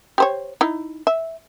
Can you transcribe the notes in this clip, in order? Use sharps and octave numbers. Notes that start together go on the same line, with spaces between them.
G4 C5 C#5
D#4 E4
E5